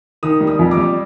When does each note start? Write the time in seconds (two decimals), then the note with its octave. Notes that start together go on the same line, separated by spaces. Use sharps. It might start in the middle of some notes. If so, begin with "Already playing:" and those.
0.23 D#3 D#6
0.41 G3
0.47 D#6
0.59 F2
0.71 D6
0.77 G3